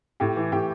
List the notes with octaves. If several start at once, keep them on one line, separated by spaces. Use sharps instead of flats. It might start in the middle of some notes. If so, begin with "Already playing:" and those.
A2 G4
E3
A2 G4